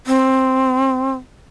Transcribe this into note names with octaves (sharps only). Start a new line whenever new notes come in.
C4